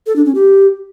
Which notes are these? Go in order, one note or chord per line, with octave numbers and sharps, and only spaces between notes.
A4
D4
C#4
G4